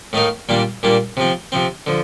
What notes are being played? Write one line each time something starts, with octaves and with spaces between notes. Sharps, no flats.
A2 A3 D#4 A#4 F5
A#2 G3 A#3 D4
A#2 G3 A#3 D4
C3 F3 C4
C3 F3 C4
D3 F3